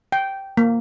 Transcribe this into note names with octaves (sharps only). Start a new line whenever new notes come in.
G5
A#3